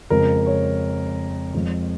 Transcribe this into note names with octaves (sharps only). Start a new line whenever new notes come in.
F2 C#3 G#3 A#4
C#5
F2 F3 G#3